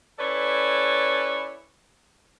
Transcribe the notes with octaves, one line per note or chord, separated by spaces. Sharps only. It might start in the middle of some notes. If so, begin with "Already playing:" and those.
C#4 E4 A4 B4 C#5 D5